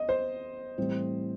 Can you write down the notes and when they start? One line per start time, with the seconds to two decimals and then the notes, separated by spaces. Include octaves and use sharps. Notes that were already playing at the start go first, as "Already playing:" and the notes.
Already playing: D#5
0.09 C5
0.78 A2 E3 G3 C4